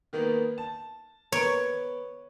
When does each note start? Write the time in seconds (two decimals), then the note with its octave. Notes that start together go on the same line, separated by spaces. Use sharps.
0.13 D#3 A#3 B3
0.58 A5
1.32 B3 C#5 D7